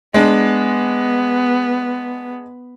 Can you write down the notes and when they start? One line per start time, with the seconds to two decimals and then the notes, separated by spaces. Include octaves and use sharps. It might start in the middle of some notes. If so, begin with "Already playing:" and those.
0.14 G#3 B3 D4